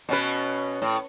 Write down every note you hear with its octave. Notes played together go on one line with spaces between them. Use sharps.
B2 C#4 B4
A2